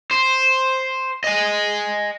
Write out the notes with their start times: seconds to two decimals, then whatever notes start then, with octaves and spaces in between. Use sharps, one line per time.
0.11 C5
1.24 D#5 G#5